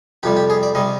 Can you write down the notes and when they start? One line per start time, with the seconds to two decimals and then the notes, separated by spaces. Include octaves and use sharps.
0.23 F2 C3 G3 G4
0.36 G4
0.50 G#4
0.63 D5
0.75 C3 G3 D#5